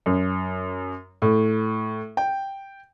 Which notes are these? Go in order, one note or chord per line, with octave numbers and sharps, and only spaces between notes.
F#2
A2
G5